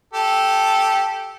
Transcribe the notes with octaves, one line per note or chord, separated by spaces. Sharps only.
G4 A4